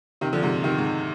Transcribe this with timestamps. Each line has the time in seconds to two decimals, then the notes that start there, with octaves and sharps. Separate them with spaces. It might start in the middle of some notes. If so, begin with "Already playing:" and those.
0.21 C3 D#3
0.33 D3 F3
0.43 G#2 C3
0.64 C3 D#3
0.78 G#2